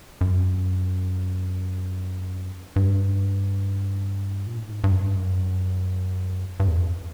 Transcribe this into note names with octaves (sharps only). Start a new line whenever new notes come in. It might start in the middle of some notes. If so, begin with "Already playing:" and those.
F#2
G2
A#2
A2
G#2
G2
F#2
G2
F#2
G2
E2
F2